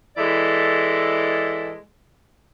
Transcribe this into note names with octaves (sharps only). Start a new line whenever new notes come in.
E3 G#3 E4 A4 D5